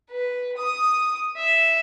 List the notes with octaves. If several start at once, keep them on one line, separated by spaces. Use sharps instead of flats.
B4
D#6
E5